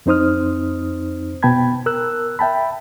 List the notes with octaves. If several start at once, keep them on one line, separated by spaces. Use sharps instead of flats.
F2 C4 D#4 C5 D#6 F6
B2 B3 G5 A5 B5 G#6
A#4 E6 F#6
E5 G5 A5 B5